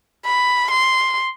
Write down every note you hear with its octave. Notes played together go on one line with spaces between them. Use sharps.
B5
C6